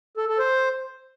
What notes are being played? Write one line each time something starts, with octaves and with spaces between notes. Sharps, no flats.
A4
A4
C5